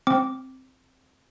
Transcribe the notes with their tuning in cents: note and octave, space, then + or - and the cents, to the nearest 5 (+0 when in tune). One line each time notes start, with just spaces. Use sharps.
C4 +0 D6 -10